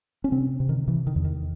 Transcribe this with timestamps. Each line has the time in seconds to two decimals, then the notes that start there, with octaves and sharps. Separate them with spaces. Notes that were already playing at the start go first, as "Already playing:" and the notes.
0.24 C#4
0.32 C3 C4
0.60 C3
0.69 D#3
0.87 C3 E3
1.07 D#3
1.16 E2
1.25 D#3